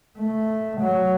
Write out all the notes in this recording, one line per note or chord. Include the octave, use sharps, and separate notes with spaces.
A3
F#3